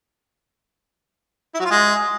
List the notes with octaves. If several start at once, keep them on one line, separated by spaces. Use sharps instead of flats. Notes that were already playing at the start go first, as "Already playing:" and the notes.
E4
F#3
F4
G#3